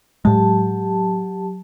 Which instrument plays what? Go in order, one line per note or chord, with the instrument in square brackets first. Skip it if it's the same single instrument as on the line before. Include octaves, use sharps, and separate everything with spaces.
[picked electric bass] A2 G#3 [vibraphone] F#3 G4 A5